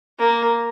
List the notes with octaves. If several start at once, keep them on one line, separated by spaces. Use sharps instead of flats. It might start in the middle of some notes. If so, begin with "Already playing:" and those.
A#3